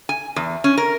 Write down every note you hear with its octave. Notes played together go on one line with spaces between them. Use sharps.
G#5
E2
C#4
A#4